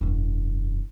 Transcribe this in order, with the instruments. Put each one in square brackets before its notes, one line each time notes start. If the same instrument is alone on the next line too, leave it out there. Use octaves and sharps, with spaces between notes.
[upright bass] E1 F#2